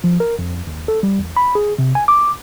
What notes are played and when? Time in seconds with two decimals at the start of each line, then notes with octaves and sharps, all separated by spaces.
0.04 F3
0.20 A#4
0.39 F2
0.67 D#2
0.88 A4
1.03 G3
1.19 E2
1.37 B5
1.55 G#4
1.79 C3
1.95 G#5
2.08 D6